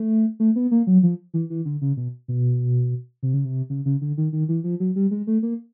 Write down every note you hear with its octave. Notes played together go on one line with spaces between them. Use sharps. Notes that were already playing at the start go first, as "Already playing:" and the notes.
Already playing: A3
A3
B3
A#3
F#3
F3
E3
E3
D3
C#3
B2
B2
C3
C#3
C3
C#3
C#3
D3
D#3
D#3
E3
F3
F#3
G3
G#3
A3
A#3